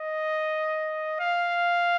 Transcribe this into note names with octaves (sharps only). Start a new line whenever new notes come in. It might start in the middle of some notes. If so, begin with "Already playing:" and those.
Already playing: D#5
F5